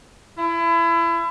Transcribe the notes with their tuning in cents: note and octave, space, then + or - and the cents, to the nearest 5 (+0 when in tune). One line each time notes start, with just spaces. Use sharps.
E4 +30